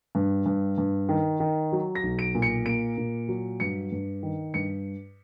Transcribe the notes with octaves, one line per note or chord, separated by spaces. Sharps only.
G2
G2
G2
D#3
D#3
F#3
A#6
B1
D7
A#2
C#7
A#3 D7
A#2
F#3
G2 C#7
G2
D#3
G2 C#7